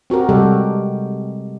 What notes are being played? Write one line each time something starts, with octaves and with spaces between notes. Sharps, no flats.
C4 F#4 G4 A#4
C3 G3 G#3 F#4 G4 A4